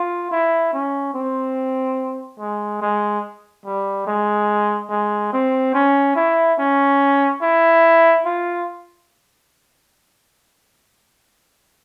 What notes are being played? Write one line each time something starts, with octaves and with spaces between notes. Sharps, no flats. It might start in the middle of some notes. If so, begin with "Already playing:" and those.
Already playing: F4
E4
C#4
C4
G#3
G#3
G3
G#3
G#3
C4
C#4
E4
C#4
E4
F4